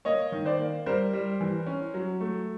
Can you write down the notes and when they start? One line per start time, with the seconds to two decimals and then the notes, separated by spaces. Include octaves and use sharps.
0.05 A#3 C#5 D#5
0.32 D#3
0.46 C5 D5
0.59 A#3
0.86 G3 A#4 C5
1.13 G3
1.41 E3
1.67 C#4
1.94 F#3
2.20 A3